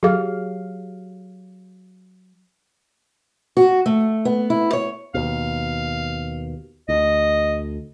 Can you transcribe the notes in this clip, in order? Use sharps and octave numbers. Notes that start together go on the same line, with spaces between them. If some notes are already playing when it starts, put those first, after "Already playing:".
F#3 G4 G#4 F5
F#4
A3
B3
E4
C#5
D#2 B2 F5
D2 D#5